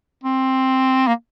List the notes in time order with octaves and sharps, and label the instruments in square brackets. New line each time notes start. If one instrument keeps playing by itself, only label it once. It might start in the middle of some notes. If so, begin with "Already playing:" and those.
[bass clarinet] C4
A#3